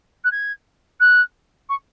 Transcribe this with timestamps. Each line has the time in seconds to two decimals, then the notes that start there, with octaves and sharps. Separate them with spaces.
0.24 F#6
0.31 G#6
1.00 F#6
1.69 C#6